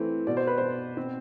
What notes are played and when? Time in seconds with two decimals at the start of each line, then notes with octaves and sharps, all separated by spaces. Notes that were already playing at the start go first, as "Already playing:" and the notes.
Already playing: E3 A3 C4
0.27 B2 D5
0.37 C5
0.47 B4
0.58 B2 C5
0.97 C4